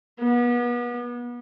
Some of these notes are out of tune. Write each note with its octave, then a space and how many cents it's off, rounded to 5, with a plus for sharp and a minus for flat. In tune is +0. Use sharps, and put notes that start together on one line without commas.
B3 -35